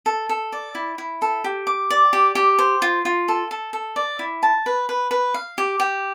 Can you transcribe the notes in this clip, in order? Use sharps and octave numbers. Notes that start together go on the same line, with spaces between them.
A4
A4
D5
E4
E4
A4
G4
D6
D5
G4
G4
C5
F4
F4
A4
A4
A4
D5
E4
A5
B4
B4
B4
F5
G4
G4